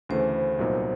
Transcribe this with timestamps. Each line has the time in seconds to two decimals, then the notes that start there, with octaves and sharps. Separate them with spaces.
0.09 D2 C#3 E3 A3 C5
0.59 C2 A#2 F#3 B3 D#4